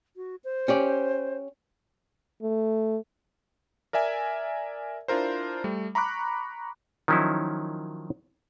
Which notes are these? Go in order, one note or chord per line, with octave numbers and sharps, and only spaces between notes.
F#4
C5
C#4 G4 D5
A3
A#4 D5 E5 G#5
D4 E4 F4 A#4 C5
G3 A3
A#5 B5 C#6 D6 F#6
D#3 F3 F#3 C#4 D#4 E4